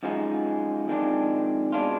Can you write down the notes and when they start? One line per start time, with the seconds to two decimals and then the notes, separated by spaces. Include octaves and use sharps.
0.03 F#2 F3 G#3 D#4
0.88 F2 D#3 G#3 D4
1.72 B2 G#3 D4 F4